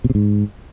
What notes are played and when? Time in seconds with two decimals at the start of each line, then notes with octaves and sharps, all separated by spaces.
0.04 B2
0.10 C3
0.15 G#2